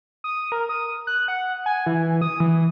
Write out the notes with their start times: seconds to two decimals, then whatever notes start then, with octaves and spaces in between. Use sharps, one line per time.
0.24 D#6
0.52 A#4
0.69 D#6
1.07 F#6
1.28 F#5
1.66 G#5
1.86 E3
2.22 D#6
2.40 E3